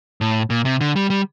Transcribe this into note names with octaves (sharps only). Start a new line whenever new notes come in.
A2
A#2
C3
D3
G3
G3